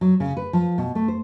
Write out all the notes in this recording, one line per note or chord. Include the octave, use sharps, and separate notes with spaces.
F#3
C#3
B4
F3
B2
A3
C5